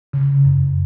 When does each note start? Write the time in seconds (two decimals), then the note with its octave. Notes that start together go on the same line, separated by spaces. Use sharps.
0.13 C#3
0.45 F#2